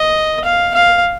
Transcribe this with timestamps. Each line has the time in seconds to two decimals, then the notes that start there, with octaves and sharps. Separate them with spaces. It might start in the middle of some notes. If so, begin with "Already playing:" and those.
Already playing: D#5
0.44 F5
0.74 F5